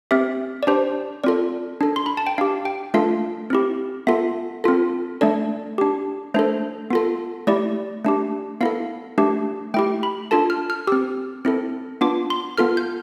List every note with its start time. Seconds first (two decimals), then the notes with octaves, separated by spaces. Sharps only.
0.11 C4 G4 E5
0.63 D5
0.67 D4 G4 C5
1.24 C4 F4 A4 D5
1.81 D4 A4
1.96 C6
2.06 B5
2.17 A5
2.27 G5
2.38 D4 G4 F5
2.65 G5
2.94 A3 D4 F4 A4 F5
3.50 C4 E4 G4
4.07 B3 F4 A4 E5
4.64 C4 F4 A4
5.21 A3 D4 A4 D5
5.78 D4 G4
6.34 A3 D4 A4 C5
6.90 B3 F4 A4
7.47 A3 E4 G4 D5
8.05 A3 D4 G4
8.61 B3 E4 A4 F5
9.18 A3 D4 G4
9.74 A3 E4 G4 G5
10.03 B5
10.31 D4 F4 A4 A5
10.50 F6
10.70 F6
10.87 C4 G4 E6
11.45 C4 E4 A4
12.01 B3 D4 F4 D6
12.30 C6
12.58 B3 F4 A4 F6
12.77 G6